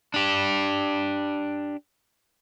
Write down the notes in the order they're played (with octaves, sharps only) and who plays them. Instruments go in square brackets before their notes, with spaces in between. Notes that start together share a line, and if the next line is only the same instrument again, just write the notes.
[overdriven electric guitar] D4 G4